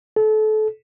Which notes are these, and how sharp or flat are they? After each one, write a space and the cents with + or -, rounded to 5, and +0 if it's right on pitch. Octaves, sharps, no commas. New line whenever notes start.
A4 -30